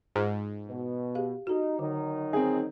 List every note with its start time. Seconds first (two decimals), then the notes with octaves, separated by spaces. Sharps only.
0.16 G#2 F4 F6
0.69 B2
1.15 G4 G#4 F5
1.47 D#4 F#4 A4
1.79 D3 D#3 F#3 D#4
2.33 C4 G#4